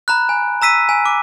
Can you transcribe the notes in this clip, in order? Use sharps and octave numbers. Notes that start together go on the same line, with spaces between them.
A#5 B5 F#6
G#5
A#5 E6 B6 D#7
G#5
D6